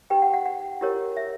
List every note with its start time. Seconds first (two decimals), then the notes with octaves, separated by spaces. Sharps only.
0.10 D#4 G4 B4 G5
0.22 F#5
0.33 F#5
0.46 F#5
0.81 E4 G4 A#4 C#5
1.17 E5